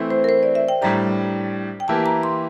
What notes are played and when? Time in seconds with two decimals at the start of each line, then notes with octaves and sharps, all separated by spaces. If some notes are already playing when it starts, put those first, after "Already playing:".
Already playing: E3 A3 C4 E4
0.11 C5
0.24 A#4
0.29 C5
0.43 D5
0.55 E5
0.68 G5
0.81 A2 G3 D4 G4 A#5
1.80 G5
1.88 E3 A#3 E4 G4 A5
2.06 A#5
2.23 C6